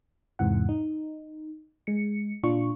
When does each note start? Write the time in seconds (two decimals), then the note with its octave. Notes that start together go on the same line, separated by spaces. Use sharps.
0.39 E2 G#2 C3 E3 F#5
0.69 D#4
1.87 G#3 C#7
2.43 A#2 D4 F4 C#6